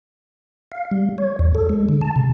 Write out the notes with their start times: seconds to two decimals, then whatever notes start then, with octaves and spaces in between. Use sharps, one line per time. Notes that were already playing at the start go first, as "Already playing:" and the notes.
0.72 F5
0.91 G3
1.18 C#5
1.39 E2
1.55 A4
1.69 G#3
1.89 D3
2.01 A5
2.16 C3